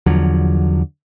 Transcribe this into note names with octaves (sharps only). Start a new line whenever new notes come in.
E2 D3 F3 F#3